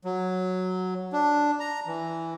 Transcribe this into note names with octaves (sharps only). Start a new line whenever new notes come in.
F#3
D4
A#5
E3